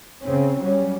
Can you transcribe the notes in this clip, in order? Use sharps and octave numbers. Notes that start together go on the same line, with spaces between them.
C#3 C4 C#4
F#3 G3 C#4